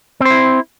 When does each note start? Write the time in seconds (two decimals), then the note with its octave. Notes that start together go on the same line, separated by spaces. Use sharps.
0.20 C4
0.25 C5
0.30 E4